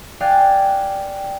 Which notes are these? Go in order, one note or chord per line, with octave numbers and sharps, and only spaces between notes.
D5 F5 G5 G#5 F#6